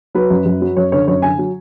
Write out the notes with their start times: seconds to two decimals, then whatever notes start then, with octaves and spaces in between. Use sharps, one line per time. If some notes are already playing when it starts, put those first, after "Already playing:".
0.15 F#3 B4
0.30 F#2
0.46 F#2
0.61 F#3
0.76 F#2 C#5
0.92 D3 C#5
1.07 F#2 C#5
1.22 D3 G#5
1.38 F#3